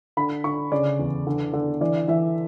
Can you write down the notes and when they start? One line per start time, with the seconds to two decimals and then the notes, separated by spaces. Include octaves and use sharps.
0.17 D3 B5
0.44 D3 C#6
0.72 C#3 D5
0.99 E2
1.27 D3
1.53 D3
1.81 E3 D5
2.08 E3 E5